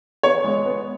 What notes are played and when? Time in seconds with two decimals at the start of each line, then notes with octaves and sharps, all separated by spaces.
0.23 B3 C#5
0.44 G#3
0.66 B3